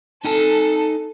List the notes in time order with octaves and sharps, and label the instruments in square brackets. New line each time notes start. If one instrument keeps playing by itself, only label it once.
[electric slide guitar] D#4 G#5 A5 [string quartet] A4